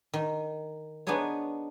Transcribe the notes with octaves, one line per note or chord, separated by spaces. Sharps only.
D#3
B3 D4 D#4 G#4 C#5